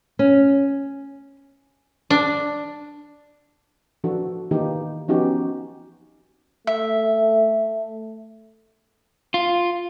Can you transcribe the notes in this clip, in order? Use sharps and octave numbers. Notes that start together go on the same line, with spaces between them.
C#4
D4
E3 F3 D4 F#4 A4
D#3 E3 A#3 D#4 F4 G4
F3 B3 C#4 D#4 F#4 G4
A3 E5
F4